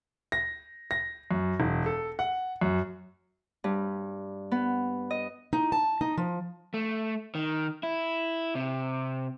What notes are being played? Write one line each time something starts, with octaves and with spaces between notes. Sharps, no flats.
A#6
A#6
F#2
E1
A4
F#5
F#2
G2
B3
D#5
D#4
A5
D#4
F3
A3
D#3
E4
C3